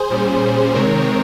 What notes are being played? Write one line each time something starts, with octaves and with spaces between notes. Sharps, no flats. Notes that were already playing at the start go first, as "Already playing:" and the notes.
Already playing: G#4 C5
A#2 G3 C#4
C3 D#3 G#3 C4 A#4 C#5